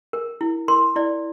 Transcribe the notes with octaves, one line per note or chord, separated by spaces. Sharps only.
A#4
E4
A#4 C6
E4 D5